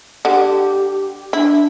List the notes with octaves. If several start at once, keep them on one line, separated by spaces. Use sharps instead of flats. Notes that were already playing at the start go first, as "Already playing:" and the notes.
D3 G4
D4 E4